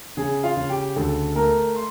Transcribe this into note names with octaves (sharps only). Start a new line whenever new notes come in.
C#3 G#4 G#5
F4 F5
C#3
G4 G5
D2 A4 A5
A3 A#4 A#5
C6